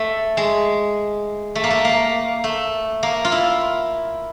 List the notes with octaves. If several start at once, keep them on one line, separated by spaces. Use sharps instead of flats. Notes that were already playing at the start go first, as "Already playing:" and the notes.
Already playing: A3
G#3
A3
A#3
A3
A#3
A3
A#3
F4
E4